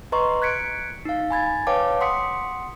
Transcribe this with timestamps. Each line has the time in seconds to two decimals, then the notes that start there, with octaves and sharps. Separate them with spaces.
0.12 B4 D#5 A#5 C6 C#6
0.42 F#6 G#6 B6 C#7 D7
1.05 D#4 F5
1.30 G#5 B5 G#6 A6
1.67 B4 C#5 F5 G5 A5 D6
2.00 F#5 C6 D#6 B6 C#7